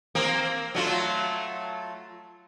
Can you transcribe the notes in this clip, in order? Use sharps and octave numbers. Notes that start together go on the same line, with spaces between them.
A#3 C4 A#4
F#3 A3 F4